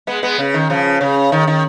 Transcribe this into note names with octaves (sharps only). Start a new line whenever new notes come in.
G#3 B3
G#3 B3
C#3
D#3
C#3 F3
C#3
D#3
D#3